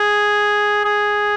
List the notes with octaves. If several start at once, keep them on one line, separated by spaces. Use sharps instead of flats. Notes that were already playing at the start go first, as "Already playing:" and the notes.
Already playing: G#4
G#4